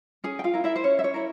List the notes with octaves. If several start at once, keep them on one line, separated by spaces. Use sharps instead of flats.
C#4 G#4 G#5
G5
F4 F5
E4 A#4
E4 E5
C5
C#4 C#5
E5
C#5
E4 A#4